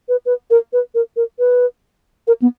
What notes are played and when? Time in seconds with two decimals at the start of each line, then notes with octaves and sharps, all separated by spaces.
0.09 B4
0.26 B4
0.51 A#4
0.73 B4
0.95 A#4
1.17 A#4
1.39 B4
2.27 A#4
2.42 B3